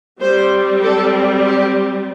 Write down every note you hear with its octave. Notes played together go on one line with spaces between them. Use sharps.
G3 C4 C5
A4
G4